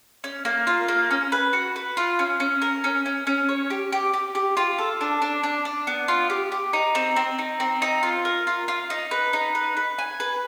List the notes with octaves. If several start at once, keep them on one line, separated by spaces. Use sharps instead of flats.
C#4
A#3
F4
A#3
C#4
B4
F#4
B4
F4
C#4
C#4
A#4
C#4
C#4
C#4
C#5
G4
G4
G4
G4
F4
A4
D4
D4
D4
D4
B3
F4
G4
G4
D#4
C4
C4
D#4
C4
D#4
F4
A#4
F4
F4
D#4
B4
D#4
B4
B4
G#5
B4